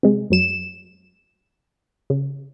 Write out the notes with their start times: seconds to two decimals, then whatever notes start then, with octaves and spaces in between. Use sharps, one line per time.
0.03 C3 G#3
0.30 F#2 F#3 E7
2.10 C#3